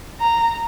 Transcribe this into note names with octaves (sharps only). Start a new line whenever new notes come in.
A#5